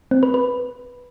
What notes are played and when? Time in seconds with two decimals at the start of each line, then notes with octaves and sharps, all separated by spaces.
0.11 C4
0.23 B4
0.34 B4